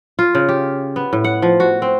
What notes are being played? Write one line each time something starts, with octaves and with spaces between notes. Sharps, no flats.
F4
C#3
G4
B3
A2
F#5
F3
F#4
C4